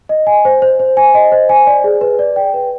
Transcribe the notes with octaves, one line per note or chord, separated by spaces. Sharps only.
D#5
G#5
C5
C5
C5
G#5
D#5
C5
G#5
D5
G#4
B4
D5
G5
B4